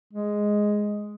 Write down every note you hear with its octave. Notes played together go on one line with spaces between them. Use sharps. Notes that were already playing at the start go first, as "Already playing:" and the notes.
G#3